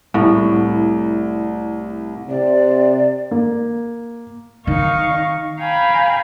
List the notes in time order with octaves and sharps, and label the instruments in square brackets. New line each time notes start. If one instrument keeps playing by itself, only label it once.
[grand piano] C2 [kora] A2
[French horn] C3 [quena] D5
[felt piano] A#3
[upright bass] D#3 [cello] D#4 [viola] F5 C#6
[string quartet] F5 G5 G#5 A#5 B5